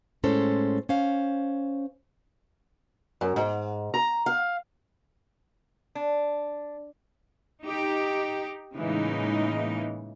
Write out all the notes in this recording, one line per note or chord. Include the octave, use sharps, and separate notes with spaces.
A2 G#3 C#4 A4 C5
C#4 C5 F5
F#2
G#2
A#5
F5
D4
D#4 G4
A2 C#3 E3 G#3 A#3 D#4